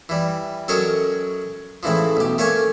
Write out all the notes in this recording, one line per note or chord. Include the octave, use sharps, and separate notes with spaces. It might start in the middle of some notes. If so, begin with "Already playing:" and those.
E3 G3
F#3 C#4 A4 A#4 C#5 D#5
A2 C#3 E3 F3
B1 G4
A3 A#3 C#4 C#5 G#5